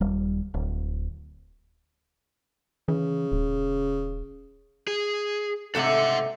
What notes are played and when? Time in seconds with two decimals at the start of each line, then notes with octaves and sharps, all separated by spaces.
0.01 D#1 G3
0.54 D1
2.88 C#3 E3
3.32 D#1
4.87 G#4
5.75 G#2 C3 A3 A4 F#5